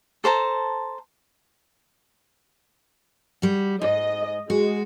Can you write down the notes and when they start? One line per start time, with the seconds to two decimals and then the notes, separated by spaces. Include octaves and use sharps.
0.24 A4 C5 A5 A#5
3.42 G3 F#4
3.82 G#2 D#5
4.50 G#3 F#4